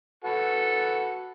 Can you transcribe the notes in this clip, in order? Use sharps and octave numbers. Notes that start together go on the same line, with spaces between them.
F#4 A4 B4